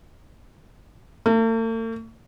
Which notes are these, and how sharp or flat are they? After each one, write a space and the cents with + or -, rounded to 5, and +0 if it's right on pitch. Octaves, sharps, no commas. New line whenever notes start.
A3 +45